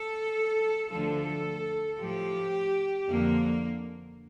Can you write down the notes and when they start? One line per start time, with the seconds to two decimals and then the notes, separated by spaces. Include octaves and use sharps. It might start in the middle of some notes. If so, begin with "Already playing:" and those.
Already playing: A4
0.89 D2 D3 F3 A4
1.99 A2 F3 G4
3.08 F2 D3 F3 A#3